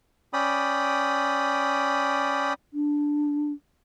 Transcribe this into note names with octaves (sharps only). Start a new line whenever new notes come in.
C#4 D5 G5 B5 D#6
D4